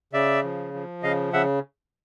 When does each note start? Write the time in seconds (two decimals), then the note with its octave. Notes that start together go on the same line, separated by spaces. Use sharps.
0.13 C#3 D5 E5
0.44 F3
0.74 F3
1.03 C#3 D#5 F5
1.33 C#3 E5 F#5